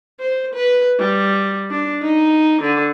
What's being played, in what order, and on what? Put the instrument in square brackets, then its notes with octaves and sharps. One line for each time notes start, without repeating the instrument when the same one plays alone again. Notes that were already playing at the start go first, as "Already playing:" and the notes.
[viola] C5
B4
G3
D4
D#4
D3